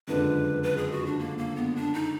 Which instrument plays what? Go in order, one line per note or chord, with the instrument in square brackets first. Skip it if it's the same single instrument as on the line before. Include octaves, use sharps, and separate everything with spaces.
[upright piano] F#1 F2 D3 G#3 D4 [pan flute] B4
[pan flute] B4
G#4
F#4
D4
A#3
A#3
B3
D4
D#4